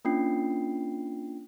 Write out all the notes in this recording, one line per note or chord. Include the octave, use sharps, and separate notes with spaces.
A#3 C#4 D4 F4 G5 C7